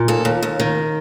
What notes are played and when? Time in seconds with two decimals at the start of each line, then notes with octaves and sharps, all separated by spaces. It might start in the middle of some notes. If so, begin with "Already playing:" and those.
Already playing: A#2
0.08 D#2 A4
0.25 D#2
0.43 D#2
0.60 D#3